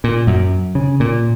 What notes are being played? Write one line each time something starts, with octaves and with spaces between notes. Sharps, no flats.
A#2
F#2
C#3
A#2